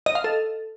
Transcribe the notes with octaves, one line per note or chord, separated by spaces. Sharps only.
D#5
F5
A4